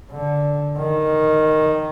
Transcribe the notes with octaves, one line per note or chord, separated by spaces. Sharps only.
D3
D#3